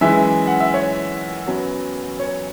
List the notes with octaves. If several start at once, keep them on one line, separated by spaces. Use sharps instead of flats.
F#2 E3 G#3 E5
F#5
E5
C#5
F#2 F#3 B3
C#5